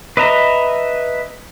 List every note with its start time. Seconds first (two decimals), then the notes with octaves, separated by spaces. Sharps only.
0.17 B4 D#5 E5 A#5